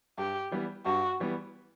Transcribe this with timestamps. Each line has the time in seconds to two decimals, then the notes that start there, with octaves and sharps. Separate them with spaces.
0.18 G2 G4
0.51 E3 G3 B3
0.86 G2 F#4
1.20 E3 G3 B3